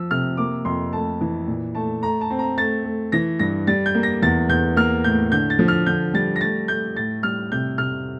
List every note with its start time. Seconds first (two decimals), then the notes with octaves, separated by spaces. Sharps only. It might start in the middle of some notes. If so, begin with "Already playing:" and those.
Already playing: F3 E6
0.11 C3 F6
0.37 A#3 D6
0.65 F2 C6
0.93 A3 A5
1.21 E3
1.47 A#2
1.75 A3 A5
2.02 A3 A#5
2.21 A5
2.30 C4
2.39 A#5
2.58 A3 A6
2.84 A3
3.12 E3 A#6
3.39 G2 A#6
3.67 G3 A6
3.86 G6
3.95 A#3
4.03 A#6
4.22 E2 A6
4.49 E2 G6
4.76 A#3 F6
5.04 A2 G6
5.32 D3 G6
5.50 A6
5.59 F3
5.68 F6
5.86 D3 G6
6.14 G3 A6
6.36 A#6
6.41 A3 A6
6.68 A3 G6
6.96 A2 A6
7.23 G3 F6
7.52 C3 G6
7.78 C3 F6